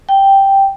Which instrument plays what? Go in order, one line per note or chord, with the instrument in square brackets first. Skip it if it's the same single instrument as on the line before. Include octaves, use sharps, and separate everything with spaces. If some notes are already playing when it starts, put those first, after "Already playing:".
[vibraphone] G5